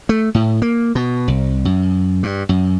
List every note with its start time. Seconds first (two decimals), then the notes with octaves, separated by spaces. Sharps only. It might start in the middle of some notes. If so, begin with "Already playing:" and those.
0.09 A3
0.35 A2
0.62 A#3
0.95 B2
1.28 C2
1.65 F#2
2.23 G2
2.49 F#2